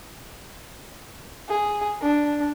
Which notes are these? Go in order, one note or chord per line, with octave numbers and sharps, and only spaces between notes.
G#4
D4